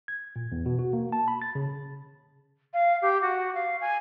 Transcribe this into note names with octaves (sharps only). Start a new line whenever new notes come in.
G#6
A#2
E2
B2
F#4
A#3
A5
B5
A6
C#3
F5
G4
F#4
F5
G#5